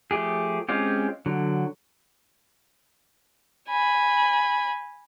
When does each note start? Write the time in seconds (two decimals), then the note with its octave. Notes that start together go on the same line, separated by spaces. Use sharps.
0.11 F3 A3 G4 G#4
0.69 G#3 C4 C#4 F4 G4
1.26 D3 F#3
3.69 G#5 B5